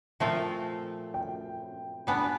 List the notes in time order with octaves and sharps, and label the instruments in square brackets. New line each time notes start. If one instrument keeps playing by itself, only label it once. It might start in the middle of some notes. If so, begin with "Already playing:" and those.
[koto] A#2 F3 A3 C4 F4 [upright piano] E5
[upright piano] G5
[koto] G3 B3 D4 [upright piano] G#5